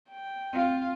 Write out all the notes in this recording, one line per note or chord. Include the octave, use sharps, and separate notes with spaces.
G5
C4 F4 F5